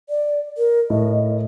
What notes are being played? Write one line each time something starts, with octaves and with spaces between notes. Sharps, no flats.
D5
A#4
A2 D#5